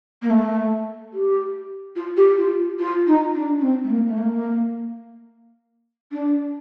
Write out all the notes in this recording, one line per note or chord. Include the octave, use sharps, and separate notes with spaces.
A#3
A3
G4
F4
G4
F4
F4
D#4
D4
D4
C4
A3
A#3
A3
A#3
D4